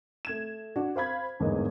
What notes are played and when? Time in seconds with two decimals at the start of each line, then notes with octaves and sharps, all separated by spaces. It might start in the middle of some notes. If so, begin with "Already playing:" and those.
0.25 A3 G#6 E7
0.76 D4 F#4
0.96 C5 F5 B5 G#6
1.40 G1 E2 G#2 A#3 B3 D#5